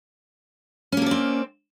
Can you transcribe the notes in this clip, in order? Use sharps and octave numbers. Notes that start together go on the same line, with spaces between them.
A#3 C4 C#4 A4 D5